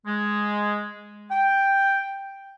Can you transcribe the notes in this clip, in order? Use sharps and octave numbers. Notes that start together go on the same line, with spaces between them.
G#3
G5